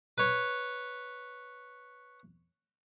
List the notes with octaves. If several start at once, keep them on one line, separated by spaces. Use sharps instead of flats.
B4 C#5